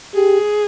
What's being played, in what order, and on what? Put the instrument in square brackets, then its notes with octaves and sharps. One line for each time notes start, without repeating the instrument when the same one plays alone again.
[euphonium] G4 [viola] G#4